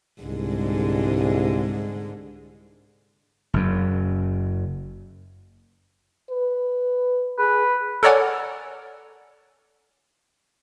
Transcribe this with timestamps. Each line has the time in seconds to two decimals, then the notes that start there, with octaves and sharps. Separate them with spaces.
0.22 C2 G#2 D3 G#3
3.54 F#1 F#2
6.30 B4
7.39 G#4 B4
8.03 A4 A#4 C#5 D5 F#5 G#5